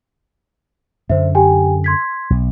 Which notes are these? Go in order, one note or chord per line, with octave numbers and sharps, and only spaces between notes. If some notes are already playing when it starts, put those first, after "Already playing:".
F#2 D3 C5 E5
G4 G5 G#5
C6 G#6 B6
B1